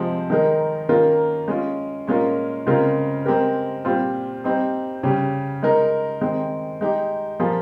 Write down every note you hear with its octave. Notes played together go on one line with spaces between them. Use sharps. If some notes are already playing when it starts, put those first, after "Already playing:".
Already playing: C3 F3 G#3 C4
D#3 G#3 D#4 A#4
D#3 A#3 C#4 F4 A#4
G#3 C#4 F4
A#2 G#3 C#4 F4 A#4
C#3 G#3 C4 F4 A#4
G#3 C4 G4 A#4
A#2 G3 C4 F4
G3 C4 D#4
C#3 G3 C#4 G4
G#3 D#4 A#4
D#3 G#3 C4
G#3 D#4 G4
A#2 F3 A#3 F4 G#4